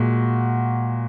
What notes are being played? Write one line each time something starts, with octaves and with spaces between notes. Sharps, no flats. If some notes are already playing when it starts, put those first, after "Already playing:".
Already playing: A#2 G#3 F#4